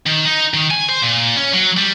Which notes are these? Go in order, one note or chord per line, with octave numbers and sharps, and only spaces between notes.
D#3
D#4
D#3
G#5
C5
A#2
C#4
F#3
G3